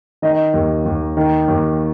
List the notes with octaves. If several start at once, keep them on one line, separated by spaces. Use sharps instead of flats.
D#3 D#5
D#2
D#2
D#3
D#2